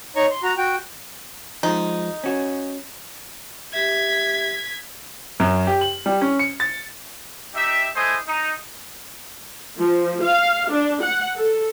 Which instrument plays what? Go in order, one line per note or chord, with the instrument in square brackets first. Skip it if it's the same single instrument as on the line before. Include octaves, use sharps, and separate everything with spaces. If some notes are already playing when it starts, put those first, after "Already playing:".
[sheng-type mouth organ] D#4 C#5 A#5 C#6
C6
F#4 A#5
F#4 G5
[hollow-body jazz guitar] F3 G#3 [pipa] D#4
[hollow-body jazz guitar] C#4 F#4
[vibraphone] G4 E5 [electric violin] G#6 B6
[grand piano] F#2
G4
F#7
G3
C#4
C#7
A6
[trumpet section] D#4 G4 E5
A3 E4 C5 D#5 G#5 D#6
D#4
[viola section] F3
F5
D4
F#5
A4